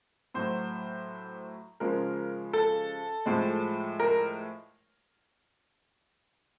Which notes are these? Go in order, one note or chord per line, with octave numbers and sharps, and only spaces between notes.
A2 F#3 C5
C#3 F3 G#3 A#4
A4
A2 F3 G#3
A#4